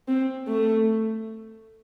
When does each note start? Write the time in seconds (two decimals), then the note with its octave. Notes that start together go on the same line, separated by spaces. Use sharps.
0.08 C4
0.48 A3